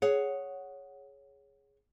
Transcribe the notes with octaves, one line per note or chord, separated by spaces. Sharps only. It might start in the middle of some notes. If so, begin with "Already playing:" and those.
G#4 C#5 F#5